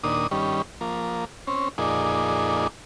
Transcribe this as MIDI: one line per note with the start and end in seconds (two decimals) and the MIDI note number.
0.04 0.27 39
0.04 0.27 46
0.04 0.27 62
0.04 0.27 87
0.31 0.62 43
0.31 0.62 51
0.31 0.62 55
0.31 0.62 61
0.81 1.25 53
0.81 1.25 58
1.47 1.69 60
1.47 1.69 61
1.78 2.67 41
1.78 2.67 46
1.78 2.67 63
1.78 2.67 68
1.78 2.67 74